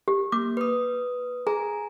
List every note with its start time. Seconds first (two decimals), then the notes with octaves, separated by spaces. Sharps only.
0.08 G4
0.32 A#3 D6
0.57 B4 D#6
1.47 G#4 G#5 A#5